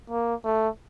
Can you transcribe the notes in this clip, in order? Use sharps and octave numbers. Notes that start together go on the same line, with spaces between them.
A#3
A3